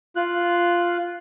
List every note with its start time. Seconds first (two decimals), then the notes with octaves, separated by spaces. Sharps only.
0.16 F4 F#6